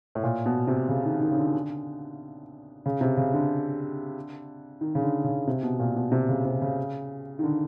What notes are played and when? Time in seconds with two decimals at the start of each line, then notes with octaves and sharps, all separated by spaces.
0.15 A2
0.23 A#2
0.46 B2
0.67 C3
0.89 C#3
1.05 D#3
1.21 D#3
1.31 C#3
1.37 D3
2.86 C#3
3.01 C3
3.17 C#3
3.34 D3
4.81 D#3
4.95 C#3
5.03 D3
5.24 C#3
5.47 C3
5.63 B2
5.80 A#2
5.96 B2
6.12 C3
6.29 C#3
6.45 C3
6.62 C#3
7.39 D#3
7.44 D3